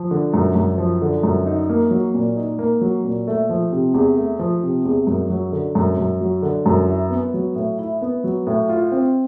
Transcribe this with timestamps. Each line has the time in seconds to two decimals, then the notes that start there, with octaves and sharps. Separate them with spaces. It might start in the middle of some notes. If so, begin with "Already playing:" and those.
Already playing: F3
0.11 D3
0.34 F#2
0.55 F#2
0.78 F3
1.02 D3
1.23 F#2
1.46 D#4
1.69 A#3
1.91 F#3
2.14 A#2
2.37 D#4
2.59 A#3
2.81 F#3
3.04 A#2
3.27 A3
3.49 F3
3.72 C3
3.94 E2
4.17 A3
4.39 F3
4.63 C3
4.85 E2
5.07 F#2
5.30 F#3
5.52 D3
5.75 F#2
5.97 F#2
6.21 F#3
6.42 D3
6.66 F#2
6.88 E4
7.10 B3
7.34 F#3
7.55 A2
7.79 E4
8.02 B3
8.24 F#3
8.47 A2
8.69 F4
8.92 C4